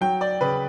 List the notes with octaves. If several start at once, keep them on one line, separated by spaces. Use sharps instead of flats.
F#3 G5
D5
C#3 B4